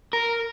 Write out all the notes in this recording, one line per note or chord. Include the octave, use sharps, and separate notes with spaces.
A#4